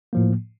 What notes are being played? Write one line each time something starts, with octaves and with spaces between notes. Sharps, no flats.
A2 F3 A#3